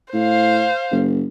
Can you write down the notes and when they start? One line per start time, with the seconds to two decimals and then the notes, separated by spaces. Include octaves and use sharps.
0.14 A2 C5 F5
0.91 F#1